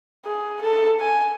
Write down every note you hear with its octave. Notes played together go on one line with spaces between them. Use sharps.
G#4
A4
G#5